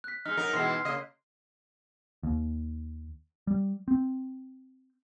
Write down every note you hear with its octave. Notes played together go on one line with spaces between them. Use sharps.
F#6 B6
G#3 D#4 F6
F#3 D#4 A#4
B2 E3 G#3 C6 C7
C#3 A#3 D#5
D#2
G3
C4